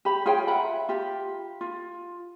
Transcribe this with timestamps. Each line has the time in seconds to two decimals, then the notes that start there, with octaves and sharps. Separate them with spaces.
0.05 G4 B5
0.26 F4 G#4 C#5 G5
0.47 E5 F#5 A#5 B5
0.89 F4 G4
1.61 F4